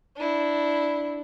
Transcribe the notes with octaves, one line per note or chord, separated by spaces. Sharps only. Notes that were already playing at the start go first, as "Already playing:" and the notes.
D4 E4